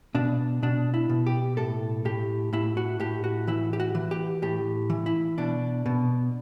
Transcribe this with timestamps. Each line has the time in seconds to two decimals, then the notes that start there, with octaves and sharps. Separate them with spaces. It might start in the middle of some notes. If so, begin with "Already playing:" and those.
0.15 B2 D4
0.63 B2 D4
0.94 E4
1.10 B2
1.26 G4
1.57 A2 A4
2.05 A2 G4
2.53 A2 E4
2.77 F#4
3.00 A2 G4
3.24 F#4
3.47 E3 E4
3.73 G4
3.80 F#4
3.95 E3
4.11 G4
4.42 A2 G4
4.90 E3
5.06 E4
5.38 B2 D4
5.86 B2